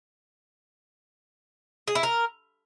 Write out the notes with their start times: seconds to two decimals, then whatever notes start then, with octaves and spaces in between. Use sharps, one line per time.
1.88 G#4
1.95 E4
2.03 A#4